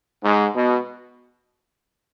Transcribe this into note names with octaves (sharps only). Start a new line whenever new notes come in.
G#2
B2